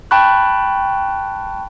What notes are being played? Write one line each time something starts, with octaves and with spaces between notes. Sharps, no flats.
G5 A5 B5 C#6 F#6